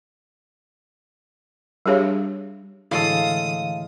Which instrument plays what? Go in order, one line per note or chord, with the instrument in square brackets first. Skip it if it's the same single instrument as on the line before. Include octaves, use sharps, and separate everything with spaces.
[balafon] G3 D4 G4 G#4 C#5 F5
[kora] A2 G#3 A4 [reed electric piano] D3 E3 [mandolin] F5 [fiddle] D#6